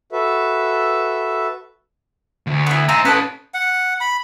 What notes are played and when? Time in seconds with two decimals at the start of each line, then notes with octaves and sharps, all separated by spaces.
0.12 F#4 A4 B4 E5
2.47 D2
2.67 B3 E4
2.89 C4 D#4 G#5 A#5
3.05 C#4 A4 B4 D#5 A5
3.54 F#5
4.01 B5